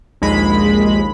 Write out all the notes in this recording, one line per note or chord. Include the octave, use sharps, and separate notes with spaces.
A#1 D#2 G#3 B5